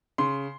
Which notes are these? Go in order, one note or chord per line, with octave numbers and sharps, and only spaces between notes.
C#3 C6